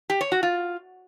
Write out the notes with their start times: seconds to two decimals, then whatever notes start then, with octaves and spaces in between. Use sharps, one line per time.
0.10 G4
0.21 C#5
0.32 F#4
0.43 F4